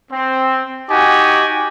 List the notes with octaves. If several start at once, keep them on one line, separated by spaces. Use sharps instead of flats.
C4
D#4 F#4 G4 G#5